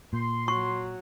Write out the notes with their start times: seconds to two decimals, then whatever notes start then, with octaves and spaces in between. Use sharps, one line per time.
0.13 A#2 C6
0.48 F#3 C#6